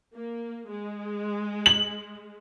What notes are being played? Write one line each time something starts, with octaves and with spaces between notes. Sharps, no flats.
A#3
G#3
F#7